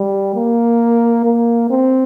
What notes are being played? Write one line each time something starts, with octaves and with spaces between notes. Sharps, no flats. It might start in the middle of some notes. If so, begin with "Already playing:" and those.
Already playing: G3
A#3
A#3
C4